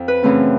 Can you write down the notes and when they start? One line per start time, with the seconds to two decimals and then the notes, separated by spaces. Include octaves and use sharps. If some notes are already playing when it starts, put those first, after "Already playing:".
Already playing: F2
0.08 B4
0.23 F#2 C#3 E3 A3 C4